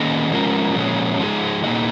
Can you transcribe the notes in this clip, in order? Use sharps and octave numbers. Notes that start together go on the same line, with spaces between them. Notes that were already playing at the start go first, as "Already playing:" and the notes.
Already playing: D#3 A#3 C#4 G#4 D#5
F3 G#3 C#4 F4 A#4
A#2 F3 G#3 C#4
F3 G#3 D#4 G#4
A#2 A#3 D#4 G#4 D#5